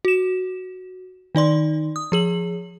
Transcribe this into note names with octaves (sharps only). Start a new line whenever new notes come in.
F#4 E7
D#3 D#4 D5 C6
D#6
F3 G#4 F#7